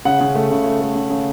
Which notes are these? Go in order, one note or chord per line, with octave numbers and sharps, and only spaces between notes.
C#3 F#5
C#3
A3
C#3
A3
A3
C#3
C#3